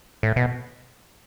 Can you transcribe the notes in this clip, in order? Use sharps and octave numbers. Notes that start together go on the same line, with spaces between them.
A2
B2